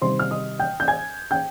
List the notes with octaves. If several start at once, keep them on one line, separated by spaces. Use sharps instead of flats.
C3 D#3 G3 C5 C6
F6
D#5 D#6
G5 G6
G6
G#5 G#6
G5 G6